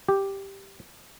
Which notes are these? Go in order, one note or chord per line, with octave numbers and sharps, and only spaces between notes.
G4